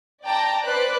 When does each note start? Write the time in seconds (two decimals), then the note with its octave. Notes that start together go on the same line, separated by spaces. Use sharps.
0.25 D5 G5 A5 A#5
0.65 B4 C5 D5 F#6